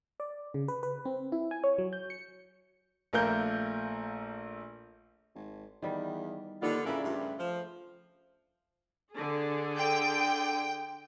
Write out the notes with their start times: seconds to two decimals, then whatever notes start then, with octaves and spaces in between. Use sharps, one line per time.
0.20 D5
0.54 C#3
0.68 B4
0.83 B4
1.05 C4
1.32 E4
1.51 G#5
1.64 C#5
1.78 F#3
1.93 G6
2.10 C#7
3.13 A#1 A3 A#3 A#4 G6 G7
5.35 G#1
5.82 E2 D#3 G3 B4
6.62 D#2 D3 B3 D4 F4 A4
6.85 C#3 E3 E4 A#4 B4 D5
7.04 G2 G3 A3 F4
7.39 F3
9.12 D3 G#4
9.79 G5